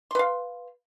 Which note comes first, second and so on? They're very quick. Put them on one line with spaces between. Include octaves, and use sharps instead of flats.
C6 B4 F5